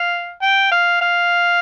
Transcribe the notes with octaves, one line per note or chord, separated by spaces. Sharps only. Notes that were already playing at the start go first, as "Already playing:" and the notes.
Already playing: F5
G5
F5
F5